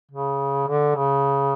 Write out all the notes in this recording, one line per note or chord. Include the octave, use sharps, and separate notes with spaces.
C#3
D3
C#3